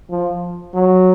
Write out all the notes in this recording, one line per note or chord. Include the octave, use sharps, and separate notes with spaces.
F3
F#3